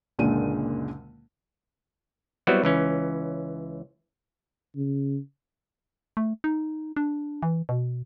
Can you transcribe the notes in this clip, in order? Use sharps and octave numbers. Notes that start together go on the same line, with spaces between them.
F#1 C#2 A#2 D3 G#3 D#7
F#3 G3 B3 C4 E4 F#4
C#2 E3 C#4
C#3
A3
D#4
D4
E3
B2